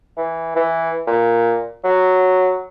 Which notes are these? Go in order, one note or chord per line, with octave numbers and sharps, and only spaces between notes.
E3
E3
A#2
F#3